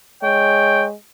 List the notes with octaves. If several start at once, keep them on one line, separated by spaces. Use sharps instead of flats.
G#3 C#5 G5